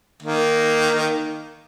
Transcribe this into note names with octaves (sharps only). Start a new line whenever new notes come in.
D#3 A#3